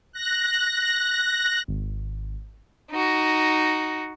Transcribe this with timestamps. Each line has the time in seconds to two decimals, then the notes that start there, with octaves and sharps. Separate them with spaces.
0.12 F#6 A#6
1.68 G#1
2.90 D#4 F#4